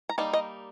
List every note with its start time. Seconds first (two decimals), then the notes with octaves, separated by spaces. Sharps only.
0.09 A#5
0.18 G3 A#3 D#4 A5
0.33 D#5